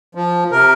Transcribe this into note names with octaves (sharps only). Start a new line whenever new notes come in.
F3
C3 A#4